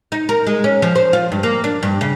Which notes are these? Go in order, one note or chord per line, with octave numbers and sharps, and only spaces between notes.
D#4
A#4
G#3
C#4
F3
C5
F4
G2
A#3
D4
G2
C#3